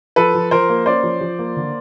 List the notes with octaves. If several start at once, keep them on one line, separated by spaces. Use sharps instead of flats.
F3 A4 B4
F3
F3 A#4 C5
A#3
C#4 C5 D5
F3
F3
A#3
D3